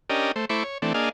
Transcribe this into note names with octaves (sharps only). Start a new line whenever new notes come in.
C#4 D4 G4 A#4 D#5
A3 C5
A3 E4 C5 B5 C#6 D6
C#5
E3 A3 C4 D4
A#3 D4 G#4 D#5 F5